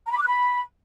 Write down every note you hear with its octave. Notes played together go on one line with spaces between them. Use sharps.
A#5
B5
D6
F#6
B5